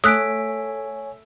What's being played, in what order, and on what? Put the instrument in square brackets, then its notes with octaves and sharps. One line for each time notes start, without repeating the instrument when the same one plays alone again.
[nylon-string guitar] A3 [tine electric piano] C#5 G#5 [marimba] D#6 F#6 [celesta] E6 B6 D7